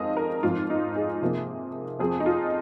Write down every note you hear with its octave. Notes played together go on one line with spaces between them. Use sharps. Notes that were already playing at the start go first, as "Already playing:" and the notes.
Already playing: F2 D#3 G#3 C4 D#5 F5
A#4
G#2 F3 C4 F4
D#4
G#4
C3 F3 A#3
F2 F3 C4 G#4
D#4
F4